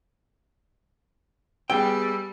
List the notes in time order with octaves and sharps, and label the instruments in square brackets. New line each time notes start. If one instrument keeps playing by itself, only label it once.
[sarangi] G3 [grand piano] B3 G#4 [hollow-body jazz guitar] G5 [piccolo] E6